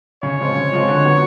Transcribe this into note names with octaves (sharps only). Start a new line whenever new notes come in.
C#3 C#5
F3 G#3 C4 F4
C#3
F3 G#3 C4 F4
D3
F#3 B3